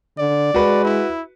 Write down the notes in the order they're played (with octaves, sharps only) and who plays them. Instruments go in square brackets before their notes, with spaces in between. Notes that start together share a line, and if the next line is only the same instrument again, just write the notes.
[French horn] D3 [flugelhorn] D5
[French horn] G#3 [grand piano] F#4 B4
[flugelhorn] E4